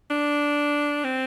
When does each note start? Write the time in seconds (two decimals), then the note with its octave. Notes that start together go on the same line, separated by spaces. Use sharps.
0.10 D4
1.04 C4